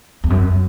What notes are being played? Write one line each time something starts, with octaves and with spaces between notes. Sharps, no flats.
E2
F#2